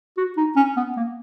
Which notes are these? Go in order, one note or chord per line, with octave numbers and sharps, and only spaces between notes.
F#4
D#4
C#4
B3
A#3